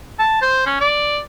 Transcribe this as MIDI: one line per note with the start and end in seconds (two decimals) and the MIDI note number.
0.19 0.38 81
0.42 0.62 72
0.66 0.78 61
0.81 1.19 74